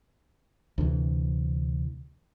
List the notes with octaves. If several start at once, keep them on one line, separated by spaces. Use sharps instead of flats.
D2 C3 E3